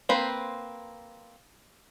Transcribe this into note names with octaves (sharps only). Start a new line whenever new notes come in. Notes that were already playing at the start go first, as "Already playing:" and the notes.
A#3 C4 B4 C5